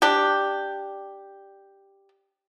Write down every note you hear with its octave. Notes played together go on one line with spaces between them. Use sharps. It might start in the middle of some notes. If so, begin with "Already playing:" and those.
D4 G4